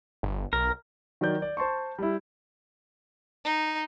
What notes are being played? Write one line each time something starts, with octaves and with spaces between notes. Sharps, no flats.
G1
B1 A#4
D#3 F#3 A#4 D5 G6
D5
C5 A5 C6 C#6
G3 E4
D#4